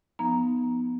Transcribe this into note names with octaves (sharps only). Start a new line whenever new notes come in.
F3 B3 D#4 A#5